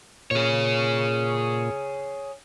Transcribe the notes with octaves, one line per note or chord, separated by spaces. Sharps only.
A#2 G#4 C#5